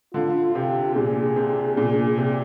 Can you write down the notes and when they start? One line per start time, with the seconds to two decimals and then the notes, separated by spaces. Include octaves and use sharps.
0.14 D3 F4
0.55 C3 G4
0.96 A#2 G#4
1.36 C3
1.77 A#2
2.18 C3